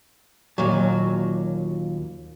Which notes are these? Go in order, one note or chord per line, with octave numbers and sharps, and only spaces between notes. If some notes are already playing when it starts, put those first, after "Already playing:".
D#2 A#2 F#3